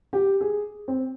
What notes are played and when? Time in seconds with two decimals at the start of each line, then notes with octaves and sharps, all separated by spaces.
0.13 G4
0.41 G#4
0.88 C4